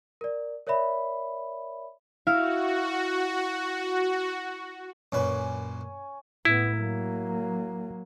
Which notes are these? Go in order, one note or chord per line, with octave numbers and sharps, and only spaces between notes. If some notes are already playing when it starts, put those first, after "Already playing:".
A#4 D5
A#4 C#5 D5 E5 B5
E4 F#4 F5
F#2 A#2 C#4 B4 G#5
A2 B3 E4
F#3 A#3